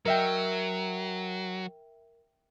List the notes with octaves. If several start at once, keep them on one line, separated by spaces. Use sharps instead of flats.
F#3 A#4 E5 G5